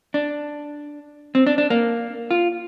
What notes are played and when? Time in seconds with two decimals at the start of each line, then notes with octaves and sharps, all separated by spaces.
0.14 D4
1.35 C4
1.47 D4
1.58 D4
1.70 A#3
2.31 F4